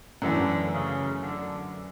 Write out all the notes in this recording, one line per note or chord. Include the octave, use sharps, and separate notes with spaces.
F#2 D3 E3 A3
C#3
D3